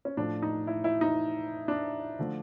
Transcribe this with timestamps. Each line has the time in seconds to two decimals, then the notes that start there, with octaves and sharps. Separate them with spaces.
0.05 C#4
0.17 A2 F3 A3 D4
0.42 D#4
0.67 E4
0.84 E4
1.01 D#4
1.68 D4
2.19 D3 F3 A3